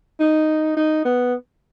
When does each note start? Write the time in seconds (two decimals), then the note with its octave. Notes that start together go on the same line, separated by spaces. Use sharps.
0.20 D#4
0.77 D#4
1.05 B3